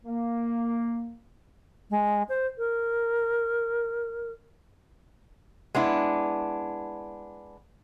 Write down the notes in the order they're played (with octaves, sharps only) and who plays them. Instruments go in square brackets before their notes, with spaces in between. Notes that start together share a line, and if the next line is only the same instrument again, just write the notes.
[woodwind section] A#3
[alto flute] G#3
C5
A#4
[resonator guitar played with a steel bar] G#3 B3 D4 E4